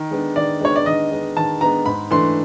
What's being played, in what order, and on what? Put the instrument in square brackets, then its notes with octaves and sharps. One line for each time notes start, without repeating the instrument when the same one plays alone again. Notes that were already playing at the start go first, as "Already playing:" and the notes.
Already playing: [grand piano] D#3
G#3 B3 D4
[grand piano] D#3 [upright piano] D5
[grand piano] G#3 B3 D4 [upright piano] C#5
[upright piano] D5
[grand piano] D#3 [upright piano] D#5
[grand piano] G#3 B3 D4
[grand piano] D#3 [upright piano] A5
[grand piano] G#3 B3 D4 [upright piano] A#5
[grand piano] G#2 [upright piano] B5
[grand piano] E3 A3 D4 [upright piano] C6